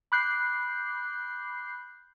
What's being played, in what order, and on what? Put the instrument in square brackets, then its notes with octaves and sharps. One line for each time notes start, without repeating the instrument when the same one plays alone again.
[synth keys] B5 D6 F#6 G6 C7